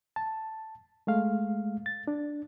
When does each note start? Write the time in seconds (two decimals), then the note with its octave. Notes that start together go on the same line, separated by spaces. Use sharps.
0.16 A5
1.07 G#3 A3 F5
1.86 A6
2.08 D4